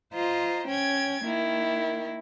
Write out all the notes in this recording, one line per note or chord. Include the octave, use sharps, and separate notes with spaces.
F4 C5 D#5 A#5
C#4 G5 G#6
D#3 A#3 E4